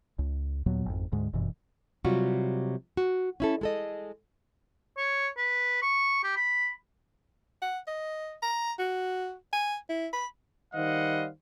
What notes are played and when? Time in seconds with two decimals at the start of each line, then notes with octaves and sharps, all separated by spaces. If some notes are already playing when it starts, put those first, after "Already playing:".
0.19 C#2
0.66 D#2 A#2 F#3 B3
0.86 G#1 F2
1.12 D2 G#2 G#3
1.33 G1 F#2 B2 E3
2.05 C3 F#3 G3 F4 F#4
2.97 F#4
3.40 C#4 E4 A4
3.61 G#3 A4 D#5
4.97 C#5
5.37 B4
5.82 C#6
6.24 G4
6.36 B5
7.62 F#5
7.88 D#5
8.42 A#5
8.79 F#4
9.53 G#5
9.89 E4
10.13 B5
10.74 D#3 G3 C5 D#5 F5 F#5